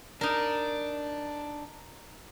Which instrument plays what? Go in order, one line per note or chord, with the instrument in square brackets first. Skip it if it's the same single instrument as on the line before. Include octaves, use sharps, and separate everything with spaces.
[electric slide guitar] D4 [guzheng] D#4 A#4